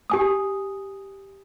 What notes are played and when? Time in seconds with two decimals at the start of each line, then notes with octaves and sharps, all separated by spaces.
0.10 G4 G#5 D#6